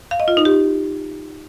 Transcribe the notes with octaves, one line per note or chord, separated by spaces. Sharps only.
F5
D#5
F4
D#4
G4